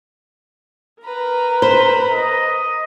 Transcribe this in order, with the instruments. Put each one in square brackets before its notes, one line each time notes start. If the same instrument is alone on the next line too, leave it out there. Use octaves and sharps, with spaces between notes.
[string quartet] A#4 B4 A#5
[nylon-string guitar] C5 [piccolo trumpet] B5
[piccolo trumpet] D#5